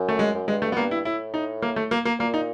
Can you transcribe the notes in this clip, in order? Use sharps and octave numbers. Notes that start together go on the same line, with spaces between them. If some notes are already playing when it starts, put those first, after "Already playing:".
Already playing: F#2
A3
G#3
F#2
G2 G#3
A3
B3
G2 A#3
E4
A2 E4
D#4
A#3
A3
A#3
A#3
A#2 A#3
D#4